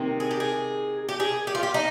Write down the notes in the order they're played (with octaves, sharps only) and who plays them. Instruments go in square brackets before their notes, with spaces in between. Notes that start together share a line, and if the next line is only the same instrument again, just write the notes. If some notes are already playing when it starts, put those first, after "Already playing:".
Already playing: [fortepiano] C3 D#3 A#3
[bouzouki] G#4
G4
G#4
G4
G#4
G4
F4
G4
D#4